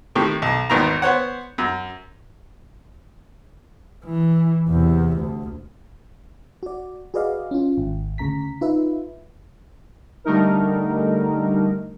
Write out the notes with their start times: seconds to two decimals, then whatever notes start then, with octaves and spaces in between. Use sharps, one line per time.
0.15 A2 C3 D#3 G4
0.42 B1
0.70 G#1 D#2 D#3 B3 A#5
1.02 B3 C5 C#5 F#5
1.58 F#2
4.05 E3
4.69 E2 C3
5.16 D2
6.63 F#4 D5
7.14 F#4 G#4 B4 D5 D#5 F5
7.51 C#4 F4
7.78 G#1
8.18 D2 C#3 A#5 B6
8.61 D#4 F4 B4 E5
10.24 D3 G3 A3 D#4 A#4